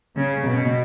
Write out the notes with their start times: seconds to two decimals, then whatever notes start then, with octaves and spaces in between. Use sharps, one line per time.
0.17 C#3
0.48 B2